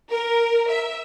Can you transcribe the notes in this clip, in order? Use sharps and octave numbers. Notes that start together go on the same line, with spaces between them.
A#4
E5